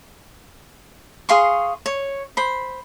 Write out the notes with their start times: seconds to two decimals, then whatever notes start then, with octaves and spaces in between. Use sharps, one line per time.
1.29 G#4 F5 C6 C#6
1.86 C#5
2.37 C5 B5